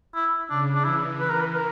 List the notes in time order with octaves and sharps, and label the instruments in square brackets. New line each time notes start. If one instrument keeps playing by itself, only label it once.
[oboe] E4
[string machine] C#3 [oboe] D4
[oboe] D4
[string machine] E3 [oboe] E4
[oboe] B4
A#4
B4
A#4